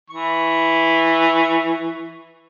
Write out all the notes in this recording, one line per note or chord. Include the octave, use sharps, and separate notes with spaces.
E3 C#6